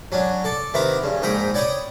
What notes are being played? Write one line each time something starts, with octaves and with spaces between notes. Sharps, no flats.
F#3 C#4 D4
A4 D5 A5
C3 D#3 B3 E4 A#5 D6
G2 C#3
A#1 G#2 D#4 G5 A#5 B5
C#5 D5 G5 B5 C#6 D#6